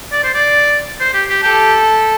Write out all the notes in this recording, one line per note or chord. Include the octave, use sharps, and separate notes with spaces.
D5
C5
D5
C5
G4
G4
G4 A4